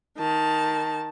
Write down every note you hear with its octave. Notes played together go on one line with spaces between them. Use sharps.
D#3 A5